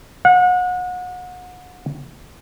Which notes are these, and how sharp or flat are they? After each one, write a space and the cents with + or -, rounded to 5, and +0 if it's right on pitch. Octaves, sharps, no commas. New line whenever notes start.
F#5 -35